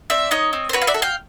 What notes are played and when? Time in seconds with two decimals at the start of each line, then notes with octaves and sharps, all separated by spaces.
0.10 C4 D5 E5
0.31 D#4 C#5 D#5
0.53 C4
0.69 C5
0.73 F#4 B4 C#5
0.82 F5
0.87 D5 E5
0.94 A4
1.02 F5 G5